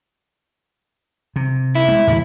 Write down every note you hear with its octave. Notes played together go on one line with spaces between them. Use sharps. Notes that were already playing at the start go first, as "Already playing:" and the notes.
C3
E4
G#3 B3
E2 A2 D3